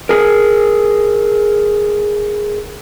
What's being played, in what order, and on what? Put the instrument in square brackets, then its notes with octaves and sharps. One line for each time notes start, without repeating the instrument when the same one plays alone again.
[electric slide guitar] G#4 A#4